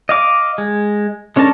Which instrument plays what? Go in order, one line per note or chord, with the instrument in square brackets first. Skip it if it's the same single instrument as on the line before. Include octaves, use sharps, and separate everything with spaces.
[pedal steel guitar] D#5 F5 D6
G#3
G#3 C#4 D4 A#4 A5